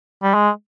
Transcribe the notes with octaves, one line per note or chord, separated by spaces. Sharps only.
G3
G#3